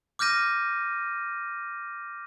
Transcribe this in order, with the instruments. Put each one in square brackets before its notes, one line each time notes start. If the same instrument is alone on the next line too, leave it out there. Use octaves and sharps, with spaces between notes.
[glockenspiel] D6 F6 G6 A#6 D#7